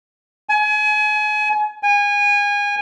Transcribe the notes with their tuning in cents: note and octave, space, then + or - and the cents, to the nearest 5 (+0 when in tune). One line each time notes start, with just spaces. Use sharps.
G#5 +35
G#5 -25